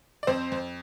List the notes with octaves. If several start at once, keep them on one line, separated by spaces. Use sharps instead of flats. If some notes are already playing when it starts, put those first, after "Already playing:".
D5
F2 C4 C5
F2